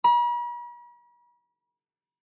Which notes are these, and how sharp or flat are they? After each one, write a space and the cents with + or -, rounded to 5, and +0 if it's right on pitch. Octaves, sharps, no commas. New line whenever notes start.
B5 -45